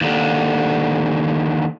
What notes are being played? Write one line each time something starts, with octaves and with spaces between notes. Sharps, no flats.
D#2 D3